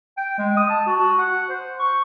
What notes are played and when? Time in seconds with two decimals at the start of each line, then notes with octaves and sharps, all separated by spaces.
0.18 G5
0.38 G#3
0.57 D#6
0.70 A5
0.87 F#4
1.00 F#4
1.19 F#5
1.49 C5
1.79 C#6